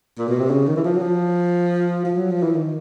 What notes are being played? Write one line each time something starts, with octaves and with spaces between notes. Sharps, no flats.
A#2
B2
C3
C#3
D#3
E3
F3
F#3
F3
F3
F#3
F3
E3
D#3